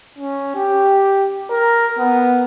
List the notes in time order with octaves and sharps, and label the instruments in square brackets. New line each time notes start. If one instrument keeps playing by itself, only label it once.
[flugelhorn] C#4
G4
A#4
B3